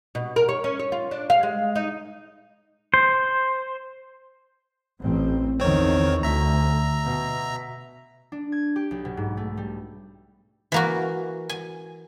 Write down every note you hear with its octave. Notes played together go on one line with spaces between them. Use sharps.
B2
A#4
C#5
C#4
C#5
F4
D4
F5
G#3
D#4
C5
A1 C4
E2 D#3 C4 C#5
D2 E5 A#5
B2
D4
G#6
G4
B1
B2
G#2
A3
G3
E3 A#3 F#4
G#5